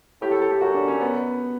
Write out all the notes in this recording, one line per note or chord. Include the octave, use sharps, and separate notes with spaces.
A2 G4
A4
A4
G4
F#2 F#4
D4
C#4
B3